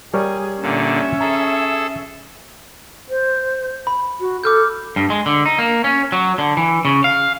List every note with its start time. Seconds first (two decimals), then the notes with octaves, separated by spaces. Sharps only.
0.14 G3 G#4 A#4 C#5
0.62 A#2 D3 C#4 E5
1.20 G#4 A4 A#5 E6
3.09 C5
3.87 B5
4.20 F#4
4.44 A4 D6 F6 G6
4.96 G2
5.10 G#3
5.26 D3
5.46 D#4
5.58 A#3
5.84 C#4
6.12 F#3
6.38 D3
6.57 E3
6.85 C#3
7.04 F5